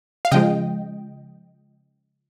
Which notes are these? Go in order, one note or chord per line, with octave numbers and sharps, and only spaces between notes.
F5
C#3 F3 G#3 D#5 G5